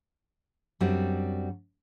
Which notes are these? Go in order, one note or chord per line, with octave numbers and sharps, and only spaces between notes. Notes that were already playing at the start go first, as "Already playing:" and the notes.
F#2 G3 C4 D4 F#4